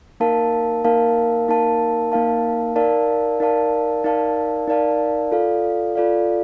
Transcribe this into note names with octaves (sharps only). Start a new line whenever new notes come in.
A#3 D#4 A#4 F5 A5
A#3 D#4 A#4 F5 A5
A#3 D#4 A#4 F5 A5
A#3 D#4 A#4 F5 A5
D#4 A#4 D5 F5 A5
D#4 A#4 D5 F5 A5
D#4 A#4 D5 F5 A5
D#4 A#4 D5 F5 A5
F4 A4 D5 F5
F4 A4 D5 F5